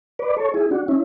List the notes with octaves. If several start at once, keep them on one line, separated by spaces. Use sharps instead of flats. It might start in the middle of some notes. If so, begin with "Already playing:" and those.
B4 D5
A4 C#5
E4 G#4
D4 F#4
C#4 E4